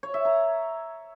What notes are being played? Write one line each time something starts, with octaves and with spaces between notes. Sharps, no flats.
C#5
E5
A#5